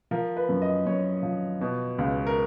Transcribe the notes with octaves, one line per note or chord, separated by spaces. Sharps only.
F3 A#4
B4
F#2
D#5
F#2 C#5
F3
B2
C#2
A#4